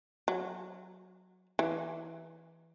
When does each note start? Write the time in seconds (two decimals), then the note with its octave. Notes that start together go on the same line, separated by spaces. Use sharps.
0.28 F#3
1.59 E3